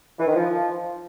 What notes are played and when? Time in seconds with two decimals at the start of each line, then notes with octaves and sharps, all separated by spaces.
0.18 E3
0.27 D#3
0.35 F3